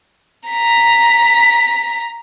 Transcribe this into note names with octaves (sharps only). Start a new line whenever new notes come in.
A#5 B6